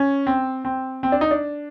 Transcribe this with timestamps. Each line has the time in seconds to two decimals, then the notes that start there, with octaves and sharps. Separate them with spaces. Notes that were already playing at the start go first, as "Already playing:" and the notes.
Already playing: C#4
0.27 C4
0.65 C4
1.03 C4
1.12 D4
1.21 D#4
1.31 D4